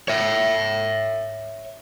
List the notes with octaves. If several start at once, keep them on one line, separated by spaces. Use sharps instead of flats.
C#5 E5